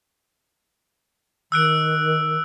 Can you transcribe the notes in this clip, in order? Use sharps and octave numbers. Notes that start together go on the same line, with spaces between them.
D#3 E6 F#6 D7